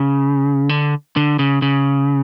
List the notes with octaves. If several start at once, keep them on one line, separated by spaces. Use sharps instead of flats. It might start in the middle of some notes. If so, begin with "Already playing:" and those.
Already playing: C#3
D3
D3
C#3
C#3